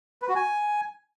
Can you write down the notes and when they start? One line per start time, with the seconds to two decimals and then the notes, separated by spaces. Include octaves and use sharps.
0.22 B4
0.29 F#4
0.36 G#5